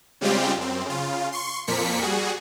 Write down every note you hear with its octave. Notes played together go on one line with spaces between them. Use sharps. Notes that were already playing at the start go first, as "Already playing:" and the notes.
C#3 G3 G#3 C4 F4 G4
F#2 C4
C#3 F4
C6 C#6
F2 A#2 F3 A#3 B6 C#7
G3 F#4 G#4